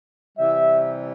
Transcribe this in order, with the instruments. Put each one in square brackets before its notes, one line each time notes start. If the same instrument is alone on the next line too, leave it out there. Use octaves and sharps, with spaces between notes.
[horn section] C3 E3 G3 E5